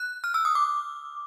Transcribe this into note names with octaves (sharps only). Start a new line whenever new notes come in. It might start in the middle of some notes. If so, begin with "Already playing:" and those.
Already playing: F#6
F6
E6
D#6
D6